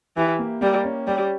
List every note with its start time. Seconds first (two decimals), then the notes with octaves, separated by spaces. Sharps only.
0.17 E3 G4
0.39 A#3
0.61 G3 A#3
0.84 C#4
1.07 G3 G4